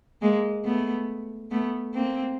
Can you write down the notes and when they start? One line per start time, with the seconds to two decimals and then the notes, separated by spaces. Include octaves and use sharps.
0.22 G#3 A#3
0.65 A3 B3
1.51 A3 B3
1.94 A#3 C4